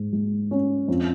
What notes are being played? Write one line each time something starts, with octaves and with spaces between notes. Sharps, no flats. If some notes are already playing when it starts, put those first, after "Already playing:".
Already playing: G#2
G#3
C#4
F2